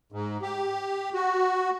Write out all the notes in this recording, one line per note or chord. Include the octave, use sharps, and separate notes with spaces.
G#2
G4
F#4